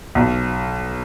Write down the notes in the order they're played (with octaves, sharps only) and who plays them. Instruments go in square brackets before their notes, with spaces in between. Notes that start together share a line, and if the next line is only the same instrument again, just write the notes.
[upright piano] B1